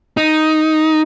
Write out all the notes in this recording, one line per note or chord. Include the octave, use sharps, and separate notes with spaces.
D#4